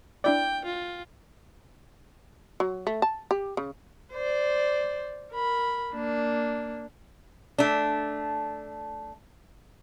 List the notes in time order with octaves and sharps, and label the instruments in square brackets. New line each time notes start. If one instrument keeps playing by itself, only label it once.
[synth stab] D4 E4 D5 [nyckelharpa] G5
[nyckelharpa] F4
[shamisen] F#3
A3
A5
G4
C#3
[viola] C5 D5
A#4 B5
A#3 D4
[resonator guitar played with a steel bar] A3 D4